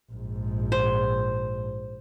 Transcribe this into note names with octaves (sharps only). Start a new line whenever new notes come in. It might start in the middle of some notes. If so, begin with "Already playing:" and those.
A#1 G#2
C5